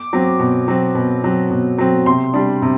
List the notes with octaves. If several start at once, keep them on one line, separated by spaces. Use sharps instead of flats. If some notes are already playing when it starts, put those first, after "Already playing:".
Already playing: D6
F#3 C4
B2
F#3 C4
B2
F#3 C4
B2
F#3 C4
C3 C6
G3 D4
C3